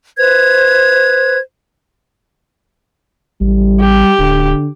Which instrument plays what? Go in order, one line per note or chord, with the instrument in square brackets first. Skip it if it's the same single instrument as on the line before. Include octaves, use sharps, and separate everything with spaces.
[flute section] B4 C5 G#6
[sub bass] A1 [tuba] G3
[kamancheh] G4
[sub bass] D1 [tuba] D3